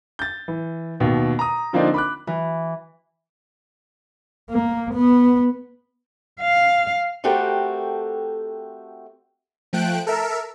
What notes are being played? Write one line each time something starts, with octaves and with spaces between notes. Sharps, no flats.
G6 A6
E3
D#2 B2
A#5 D#6
D3 F3 A#3 C4 D4 D#4
B5 D6 F#6
E3
A#3
B3
F5
A3 C4 F#4 G4 A4 A#4
F3 A3 G5 F#6 D7
A4 A#4 E5